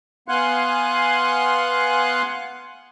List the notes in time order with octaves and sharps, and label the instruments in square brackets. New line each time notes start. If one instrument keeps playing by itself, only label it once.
[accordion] B3 F5 F#5 G#5 C6 F#6